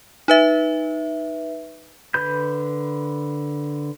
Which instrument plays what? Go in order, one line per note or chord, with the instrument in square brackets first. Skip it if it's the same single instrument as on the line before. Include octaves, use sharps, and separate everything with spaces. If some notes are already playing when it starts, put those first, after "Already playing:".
[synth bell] D#4 B4 E5
[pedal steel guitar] D3 B4 B5 G6